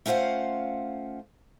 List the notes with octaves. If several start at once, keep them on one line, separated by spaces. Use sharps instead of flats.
A3 C#4 F4 C5 F5 F#5